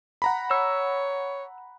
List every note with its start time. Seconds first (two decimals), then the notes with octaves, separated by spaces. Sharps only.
0.22 F#5 A#5 B5
0.51 C#5 E6